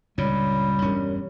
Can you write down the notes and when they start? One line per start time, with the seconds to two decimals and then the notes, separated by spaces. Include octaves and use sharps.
0.18 C#2 G2 A#2 G3 C#5
0.82 E1 G2 C#4 G4 A#4 C#5